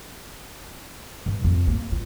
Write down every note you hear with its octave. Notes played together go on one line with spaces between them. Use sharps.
G2
F2
A#3
F4